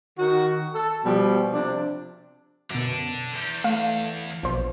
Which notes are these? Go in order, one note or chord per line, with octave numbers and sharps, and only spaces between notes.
D#3 F#4
A4
B2 F3 G3
C3 F3 D4
F#2 B2 D3 D4
E2 G6
A3 F5
A#1 B2 F3 C5